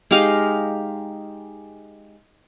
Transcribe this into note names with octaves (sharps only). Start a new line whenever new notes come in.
G#3 D#4 G4 F5